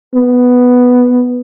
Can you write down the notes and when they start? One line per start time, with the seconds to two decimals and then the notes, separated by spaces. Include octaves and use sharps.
0.15 B3